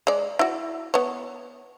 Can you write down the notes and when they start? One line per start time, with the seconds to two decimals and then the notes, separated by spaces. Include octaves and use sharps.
0.07 G#3 D5
0.39 E4 F#4
0.94 B3 C#5